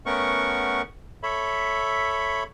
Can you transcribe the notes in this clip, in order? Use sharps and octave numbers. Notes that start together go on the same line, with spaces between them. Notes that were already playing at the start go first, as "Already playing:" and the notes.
A3 B3 C#4 A#4 F#5 C#6
A4 C#5 E5 B5